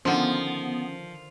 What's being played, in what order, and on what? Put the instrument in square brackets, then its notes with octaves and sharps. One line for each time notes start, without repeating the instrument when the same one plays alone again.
[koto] D3 D#3 [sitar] F3 [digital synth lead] B3 [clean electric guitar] C#4 C6